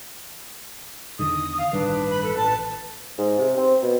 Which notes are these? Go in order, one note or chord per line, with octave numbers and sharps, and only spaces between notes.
E2 D3 D#3 D#6
F5
A1 G2 D#3 D4 B4
B5
A4
A1 A5
G#2
C3
C4
B2